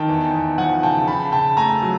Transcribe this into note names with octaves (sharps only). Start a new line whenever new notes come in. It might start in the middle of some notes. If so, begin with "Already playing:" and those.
Already playing: D#3 G5 A5
E2
E2
F3 F#5 G#5
C#3 G5 A5
C#3 A5 B5
C#3 G5 A5
A3 G#5 A#5
F#3